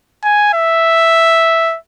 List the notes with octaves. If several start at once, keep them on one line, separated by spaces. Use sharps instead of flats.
G#5
E5